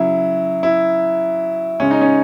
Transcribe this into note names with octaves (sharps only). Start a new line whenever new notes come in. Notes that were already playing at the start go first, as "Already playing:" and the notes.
Already playing: C#3 F#3 E4
E4
C#3 G#3 C#4
D#4
C#4